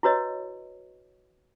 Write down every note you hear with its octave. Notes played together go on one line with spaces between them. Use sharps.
E4 F#4 B4 C#5 D#5